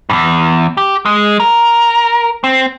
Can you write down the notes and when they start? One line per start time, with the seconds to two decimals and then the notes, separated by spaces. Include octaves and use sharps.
0.10 E2 G2
0.77 G4
1.05 G#3
1.40 A#4
2.44 C4